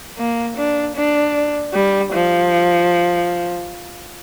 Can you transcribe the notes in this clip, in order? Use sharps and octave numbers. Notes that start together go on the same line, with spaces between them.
A#3
D4
D4
G3
F3